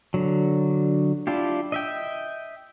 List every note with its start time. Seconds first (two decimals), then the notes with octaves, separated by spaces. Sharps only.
0.14 D3 F#3
1.27 D4 E4 F4 G4
1.72 D#5 E5 G5